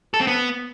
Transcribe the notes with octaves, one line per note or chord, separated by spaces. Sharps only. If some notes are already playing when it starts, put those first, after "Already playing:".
A4
C4
B3